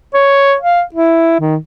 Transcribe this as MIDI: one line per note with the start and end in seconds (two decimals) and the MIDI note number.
0.14 0.55 73
0.61 0.82 77
0.94 1.39 64
1.40 1.56 51